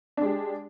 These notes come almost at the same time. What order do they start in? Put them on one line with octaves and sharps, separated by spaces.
D4 G#3 G4